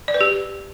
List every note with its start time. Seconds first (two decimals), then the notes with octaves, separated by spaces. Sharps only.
0.08 D5
0.14 B4
0.21 G4